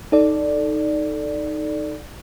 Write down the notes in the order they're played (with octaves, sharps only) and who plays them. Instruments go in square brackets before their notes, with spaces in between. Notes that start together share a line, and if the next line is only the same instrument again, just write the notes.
[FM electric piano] D#4 A4 D5